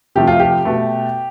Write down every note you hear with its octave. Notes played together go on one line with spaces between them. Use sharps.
C3 F3 A3 G4
F4
G4
B2 A3